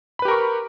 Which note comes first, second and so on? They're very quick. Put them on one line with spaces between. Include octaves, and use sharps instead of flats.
B5 B4 G4 A#4 C#6